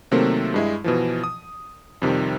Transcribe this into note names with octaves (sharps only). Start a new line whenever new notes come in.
C3 D#3 F#3 A3 A#3 C4
G2 G#3 E4
B2 E3 F3
D#6
F2 C3 D#3 G3